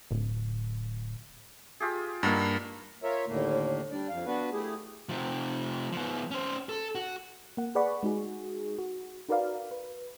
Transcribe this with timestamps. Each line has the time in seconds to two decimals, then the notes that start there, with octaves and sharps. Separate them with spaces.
0.11 D1
1.80 F4 G4 G#4
2.23 G2 A#3 D#4 F5 F#5
3.03 F4 A#4 C#5 E5
3.27 D#2 A2 D3 A3 A#3
3.91 G3 D4 D5
4.09 F2 F5
4.26 B3 D4 F#4 B4
4.52 A3 E4 G4 G#4
5.09 C3 F3
5.92 F3 B3
6.31 C#4 C5
6.69 A4
6.95 F#4
7.57 A#3 F#5
7.75 G#4 B4 D5 F#5 B5 C#6
8.03 G#3 D#4 F#4 G#4
8.79 F#4
9.29 D#4 F#4 A#4 B4 D5 F5
9.71 B4